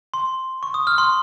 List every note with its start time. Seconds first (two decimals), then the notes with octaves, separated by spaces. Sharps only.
0.14 C6
0.63 C#6
0.74 D#6
0.87 F6
0.98 C6